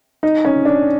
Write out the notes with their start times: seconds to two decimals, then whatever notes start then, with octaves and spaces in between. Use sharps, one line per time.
0.23 D#4
0.45 C#4
0.65 D4